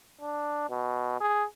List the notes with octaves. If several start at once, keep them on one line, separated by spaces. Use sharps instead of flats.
D4
B2
G#4